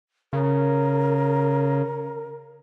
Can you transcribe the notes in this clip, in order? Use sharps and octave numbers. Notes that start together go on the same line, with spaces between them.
C#3 A#4